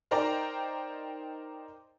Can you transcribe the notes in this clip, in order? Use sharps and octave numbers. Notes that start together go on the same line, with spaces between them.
D#4 A#4 C5 D5 G5 A#5